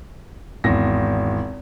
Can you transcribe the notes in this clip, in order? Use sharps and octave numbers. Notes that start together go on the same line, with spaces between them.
G#1 E2 A#6